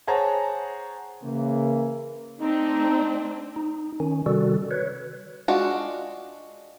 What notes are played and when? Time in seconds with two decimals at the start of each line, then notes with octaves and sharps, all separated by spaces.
0.07 G#4 C5 C#5 F#5 A5 A#5
1.23 C#3 E3 A#3
2.40 A3 C4 D4 D#4
3.56 D#4
4.00 D#3 C#4
4.26 C3 D#3 G3 F#4 A4
4.71 B4 C#5
5.48 G#3 D4 F4 F#4